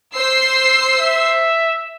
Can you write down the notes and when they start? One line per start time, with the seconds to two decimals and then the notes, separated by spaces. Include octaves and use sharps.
0.15 C5 E6 C7
1.00 E5